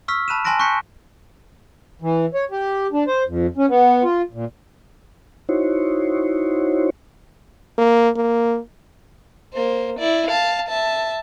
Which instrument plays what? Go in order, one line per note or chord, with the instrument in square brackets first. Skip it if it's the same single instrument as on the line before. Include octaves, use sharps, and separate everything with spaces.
[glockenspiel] C#6 E6 F6 B6
A5 B5 F#6 D#7 E7
G#5 A5 C6 F#6 A#6 D7
C#6 F#6 G6 B6 C#7
[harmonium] E3
C#5
G4
D4
C5
F2
C#4
B3
F4
A#2
[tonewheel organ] D#4 E4 F#4 C5 C#5
[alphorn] A#3
A#3
[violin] A#3 C5
E4 D5
F5 A5
E5 A5